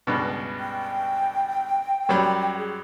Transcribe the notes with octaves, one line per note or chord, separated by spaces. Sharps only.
C#2 G2 B2
G5
F#2 F#3 G3
G#4